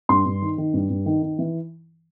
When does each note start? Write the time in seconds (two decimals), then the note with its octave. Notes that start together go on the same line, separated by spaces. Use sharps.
0.09 G2 C6
0.26 G2
0.42 D#3
0.58 D#3
0.74 G2
0.90 G2
1.06 D#3
1.23 D#3
1.39 E3